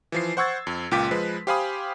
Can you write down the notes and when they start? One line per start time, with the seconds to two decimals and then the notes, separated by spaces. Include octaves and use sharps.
0.12 E3 F3 C7
0.37 C5 F#5 C#6 E6 G#6 A6
0.67 F2
0.91 C#2 A#2 F4 G5 D6 B6
1.11 F3 G#3 B4
1.47 G4 C5 F5 G#5 B5 D#6